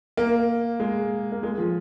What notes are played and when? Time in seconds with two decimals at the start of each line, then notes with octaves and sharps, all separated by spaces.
0.17 A#3
0.80 G#3
1.32 A#3
1.43 G#3
1.58 F3